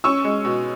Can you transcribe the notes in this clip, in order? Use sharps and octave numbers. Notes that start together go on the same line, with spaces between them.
C#4 C#6 E6
G#3
B2